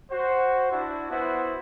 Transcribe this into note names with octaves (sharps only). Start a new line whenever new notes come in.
F#4 C5
D4 E4 F#4
B3 E4 F#4 C5